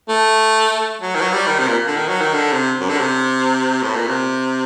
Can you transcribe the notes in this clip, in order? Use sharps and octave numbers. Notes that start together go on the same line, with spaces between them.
A3
F#3
D#3
F#3
G3
D#3
C3
A#2
D3
D#3
F#3
D#3
D3
C3
F#2
D3
C3
A2
A#2
C3